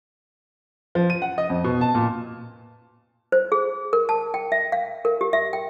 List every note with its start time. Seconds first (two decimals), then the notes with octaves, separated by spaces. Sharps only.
0.95 F3
1.10 D#7
1.22 F#5
1.38 D#5
1.50 F2
1.64 B2
1.81 A5
1.95 A#2
3.32 C5
3.52 G#4
3.93 A#4
4.09 A5
4.34 G5
4.52 E5
4.72 F5
5.05 A#4
5.21 G4
5.33 E5
5.53 G5